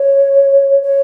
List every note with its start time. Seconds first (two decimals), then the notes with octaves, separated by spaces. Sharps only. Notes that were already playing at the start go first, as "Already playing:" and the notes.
Already playing: C#5
0.83 C#5